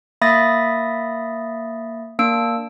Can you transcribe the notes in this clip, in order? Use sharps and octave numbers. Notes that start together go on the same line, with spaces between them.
A#3 E5 B5 D#6 A6 A#6
A#3 D4 E6 D7